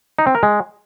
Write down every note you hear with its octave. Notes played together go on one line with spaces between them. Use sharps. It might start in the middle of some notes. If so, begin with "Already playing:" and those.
D#4
C4
A#4
G#3